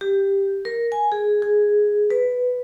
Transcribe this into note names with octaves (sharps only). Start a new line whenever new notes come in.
G4
A#4
G#5
G#4
G#4
B4